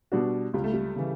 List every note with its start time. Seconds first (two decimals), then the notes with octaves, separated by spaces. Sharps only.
0.12 B2 G3 D4 F#4
0.54 C#2 G3
0.64 A3
0.74 G3
0.96 C#3 E3